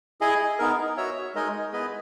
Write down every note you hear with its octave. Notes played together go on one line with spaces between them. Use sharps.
E4 G#4 D#5 G#5
B3 D#4 A#4
F#4 C#5 E5
G#3 D#4 A#4 D#5 G#5
B3 E4 G#4 B4 D#5